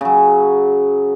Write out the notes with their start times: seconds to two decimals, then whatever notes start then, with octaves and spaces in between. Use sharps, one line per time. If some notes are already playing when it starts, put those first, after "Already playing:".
0.01 C#3 F#3